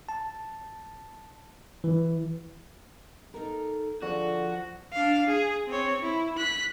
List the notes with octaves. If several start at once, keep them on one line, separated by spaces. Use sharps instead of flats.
A5
E3
D#4 A4 A#4
D3 F3 F#4 G#4
D4 F5
G#4
C4 C#5
E4
F#6 B6